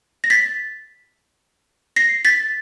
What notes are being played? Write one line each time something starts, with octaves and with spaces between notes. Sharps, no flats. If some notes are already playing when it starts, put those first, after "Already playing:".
A#6
A6 B6
A#6 C7
A6 B6